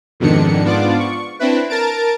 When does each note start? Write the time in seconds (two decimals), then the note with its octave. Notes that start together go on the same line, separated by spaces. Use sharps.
0.20 F2 G#2 B2 D#3 D4 C#7
0.64 G#2 B3 D4 F4 D5 D6
0.99 C#6
1.39 C4 D4 E4 B4
1.69 A#4 A5 A#5 A6 D7